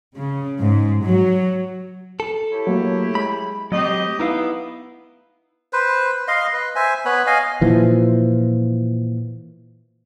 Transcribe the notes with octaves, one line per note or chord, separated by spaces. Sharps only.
C#3
G#2
F#3
A4
E4 G4 C#5
F#3 A3 A#3
G#3 B5
F#3 A3 C4 G4 D#5
B3 D#4 E4 F5
B4 C5
D#5 F5 C6
B4
C5 E5 G#5
B3 B4 C#5 B5
D#5 F5 G#5
A#2 E3 F3